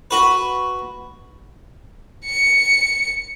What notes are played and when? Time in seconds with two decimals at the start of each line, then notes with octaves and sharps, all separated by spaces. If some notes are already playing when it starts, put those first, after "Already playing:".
0.11 F#4 B4
2.25 C#7